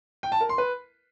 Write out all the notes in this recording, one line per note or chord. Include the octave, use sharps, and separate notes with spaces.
G5
A5
A#4
C6
B4